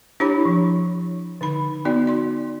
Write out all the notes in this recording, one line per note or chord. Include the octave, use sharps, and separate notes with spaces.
D4 E4 G4 C#5 B5
F3
D3 D#4 B5
B3 D#4 F#4 D5
D5 C6